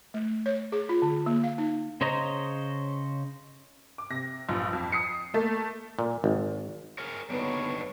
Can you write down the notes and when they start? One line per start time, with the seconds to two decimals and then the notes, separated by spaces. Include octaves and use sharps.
0.14 A3
0.46 C#5
0.72 G#4
0.89 F4
1.02 D3
1.26 A#3
1.44 F5
1.58 D#4
2.01 C#3 C5 C#5 D#5 A#5
3.98 D6
4.10 C3 A#6
4.49 A#1 G2
4.73 F2
4.92 D#6 C7 C#7
5.34 A3 A#3
5.99 A#2
6.24 G#1
6.98 G#4 A#4 C#5
7.30 F#1 D3 G3 B3 D4 D#4 C#5